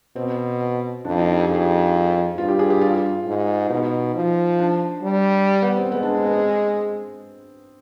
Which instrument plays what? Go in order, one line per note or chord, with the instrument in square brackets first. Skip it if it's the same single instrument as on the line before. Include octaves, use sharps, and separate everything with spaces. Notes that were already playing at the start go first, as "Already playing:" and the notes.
[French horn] B2 [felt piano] C4
[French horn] F2 [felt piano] D4
[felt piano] D#4
G4
[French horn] F2 [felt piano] G#4
[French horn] G2 [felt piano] F4
[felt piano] G4
G#4
G4
F4
[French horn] G#2
[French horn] B2 [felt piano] D#4
[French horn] F3
[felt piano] D4
[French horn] G3
[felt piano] B3
C4
[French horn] G#3 [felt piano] B3
[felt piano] D4
C4
B3
C4